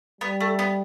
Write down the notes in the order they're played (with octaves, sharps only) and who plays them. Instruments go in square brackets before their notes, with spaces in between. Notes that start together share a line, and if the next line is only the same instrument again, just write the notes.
[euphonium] G3 [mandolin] B3
[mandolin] A3
B3